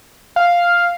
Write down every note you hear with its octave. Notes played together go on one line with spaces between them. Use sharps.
F5